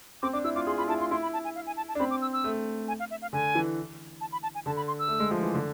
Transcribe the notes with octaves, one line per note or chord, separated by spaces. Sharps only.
C4 D6
D4 D6
E4 E6
F4 D6
G#4 C6
F4 B5
E4 A5
F4 C6
E4 C6
B5
A5
G#5
F5
G#5
A5
A5
D4
C4 B5
D6
E6
E6
A3
G#5
F5
E5
F5
D3 G#5
E3
A5
B5
A5
G#5
D3 A5
B5
C6
E6
A3
G#3
F3
E3
D3